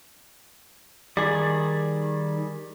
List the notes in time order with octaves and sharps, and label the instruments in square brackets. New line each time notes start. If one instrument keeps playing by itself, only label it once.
[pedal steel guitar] D#3 D5 [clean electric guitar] G3 G#4